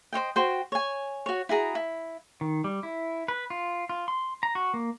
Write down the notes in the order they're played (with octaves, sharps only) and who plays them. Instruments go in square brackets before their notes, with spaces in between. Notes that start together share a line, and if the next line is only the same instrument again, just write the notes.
[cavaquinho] C5 C#5 D#5 G5
F#4 C5 G5
C#5 G#5
F#4 C#5
E4 F#4 G#4 A#5
E4
[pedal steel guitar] D#3
G3
E4
B4
F4
F4
C6
A#5
F#4
A#3